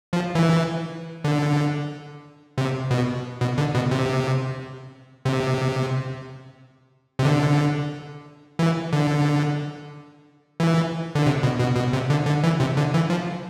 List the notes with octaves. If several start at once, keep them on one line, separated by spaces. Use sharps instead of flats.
F3
E3
D3
C3
B2
B2
D3
B2
C3
C3
C3
D3
E3
D3
E3
D3
C3
B2
B2
B2
C3
D3
D3
E3
C3
D3
E3
F3